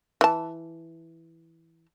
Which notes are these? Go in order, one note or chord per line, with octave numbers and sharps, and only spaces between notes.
E3 A5